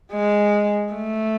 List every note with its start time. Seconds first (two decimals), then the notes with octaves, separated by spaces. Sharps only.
0.12 G#3
0.94 A3